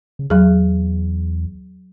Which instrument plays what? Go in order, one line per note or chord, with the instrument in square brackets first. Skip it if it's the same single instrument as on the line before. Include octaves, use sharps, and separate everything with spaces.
[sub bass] C#3
[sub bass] E2 [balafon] F#3 G#4